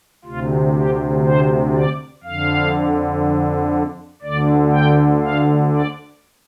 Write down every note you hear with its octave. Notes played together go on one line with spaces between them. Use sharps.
D2 C3 F4
G4
C5
D5
F2 D3 F5
D2 D3 D5
G5
F5
D5